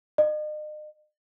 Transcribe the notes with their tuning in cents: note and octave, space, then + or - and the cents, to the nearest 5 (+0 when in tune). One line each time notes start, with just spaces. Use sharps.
D#5 -40